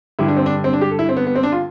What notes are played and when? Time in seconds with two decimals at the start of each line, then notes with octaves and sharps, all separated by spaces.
0.19 G2 D3 G3 E4
0.28 D4
0.37 C4
0.46 D4
0.64 C4
0.73 D4
0.81 G4
0.91 A4
0.99 E4
1.09 C4
1.17 B3
1.27 B3
1.35 C4
1.43 D4
1.52 F4